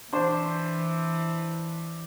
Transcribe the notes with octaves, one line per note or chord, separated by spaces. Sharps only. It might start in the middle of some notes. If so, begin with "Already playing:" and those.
E3 D4 C5